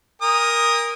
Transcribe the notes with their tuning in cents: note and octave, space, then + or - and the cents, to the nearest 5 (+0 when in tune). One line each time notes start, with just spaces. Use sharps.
A#4 +10 G#5 -40 D#6 +0